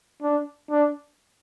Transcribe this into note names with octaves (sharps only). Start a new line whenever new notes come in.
D4
D4